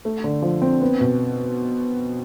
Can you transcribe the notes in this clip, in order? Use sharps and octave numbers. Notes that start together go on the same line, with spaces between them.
A3
D3
F3
C4
B3
B2